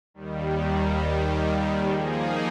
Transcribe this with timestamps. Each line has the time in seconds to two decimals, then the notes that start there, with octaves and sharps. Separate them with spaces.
0.14 D#2 D#3 G3
1.87 F3 A#3 D#4 G#4